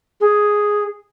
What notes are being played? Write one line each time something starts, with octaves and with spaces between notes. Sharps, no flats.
G#4